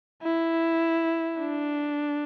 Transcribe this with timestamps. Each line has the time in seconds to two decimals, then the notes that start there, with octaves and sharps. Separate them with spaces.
0.23 E4
1.39 D4